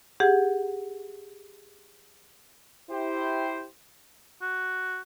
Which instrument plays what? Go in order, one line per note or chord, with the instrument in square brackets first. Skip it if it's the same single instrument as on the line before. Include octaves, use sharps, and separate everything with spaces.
[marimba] G4 G#4 F#5
[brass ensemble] E4 G4 C5
[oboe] F#4